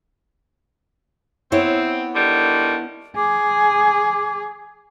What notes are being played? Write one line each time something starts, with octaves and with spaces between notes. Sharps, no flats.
B3 C4 E4 C#5
D3 D#3 G3
G#4 D6